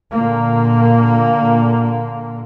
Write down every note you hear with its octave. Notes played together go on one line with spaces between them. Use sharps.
A#2 D3 A#3